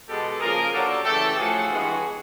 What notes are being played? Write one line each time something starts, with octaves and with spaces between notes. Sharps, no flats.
B2 G#3 B3 G4 A4
C#3 F3 A#3 G#4 A#4
D3 F#3 A#3 G4 A4
C#3 E3 A3 G4 A4
A2 F3 A3 F#4 G#4
G2 E3 G#3 B3